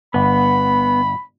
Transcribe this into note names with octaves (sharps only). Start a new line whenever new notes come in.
G1 B3 B5